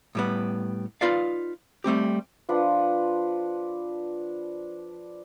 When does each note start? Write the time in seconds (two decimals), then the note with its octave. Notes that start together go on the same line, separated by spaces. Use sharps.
0.15 A2 G3 B3
1.01 D#4 F4 B4 D5 F5
1.84 G3 A3 C4 G4
2.49 F3 D4 B4 F#5